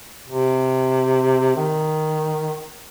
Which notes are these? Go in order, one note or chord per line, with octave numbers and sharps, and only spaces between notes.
C3
D#3